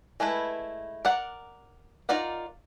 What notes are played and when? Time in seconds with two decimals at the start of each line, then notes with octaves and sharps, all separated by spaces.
0.20 G#3 A3 E4 B4
1.05 A#4 D5 F#5
2.09 D#4 F4 A#4 D5 F#5